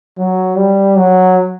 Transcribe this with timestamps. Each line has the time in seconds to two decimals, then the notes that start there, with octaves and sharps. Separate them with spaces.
0.18 F#3
0.57 G3
0.96 F#3